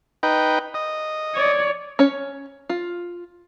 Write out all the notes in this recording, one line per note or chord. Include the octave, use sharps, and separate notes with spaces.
D#4 B4 G5
D#5
C#5 D5
C#4 C#5
F4